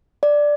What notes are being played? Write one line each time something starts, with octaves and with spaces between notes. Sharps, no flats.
D5